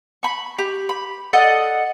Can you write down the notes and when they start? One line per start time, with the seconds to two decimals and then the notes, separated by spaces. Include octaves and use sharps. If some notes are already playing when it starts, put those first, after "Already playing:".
0.23 B5 C#6
0.58 G4
0.89 B5
1.33 A4 D5 D#5 F#5